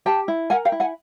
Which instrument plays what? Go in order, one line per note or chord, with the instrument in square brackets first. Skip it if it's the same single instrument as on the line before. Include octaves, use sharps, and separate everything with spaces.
[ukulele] G4 G5 A5
E4
A#4 F#5 G#5
F5 G5
E4
F#5 G#5